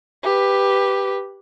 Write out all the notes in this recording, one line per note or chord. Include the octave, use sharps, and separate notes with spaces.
G4 B4